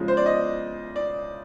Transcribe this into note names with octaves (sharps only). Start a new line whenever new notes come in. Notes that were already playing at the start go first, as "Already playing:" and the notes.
Already playing: C#3 F3 G#3
C5
D5
D#5
D5